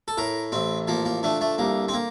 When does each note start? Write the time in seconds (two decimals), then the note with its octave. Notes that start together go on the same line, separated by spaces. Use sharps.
0.08 A4
0.17 A2 A#4
0.52 A1 C4
0.88 F3 A#3
1.05 A#3
1.23 D3 A3
1.41 A3
1.58 C2 A#3
1.88 C4
1.94 A#3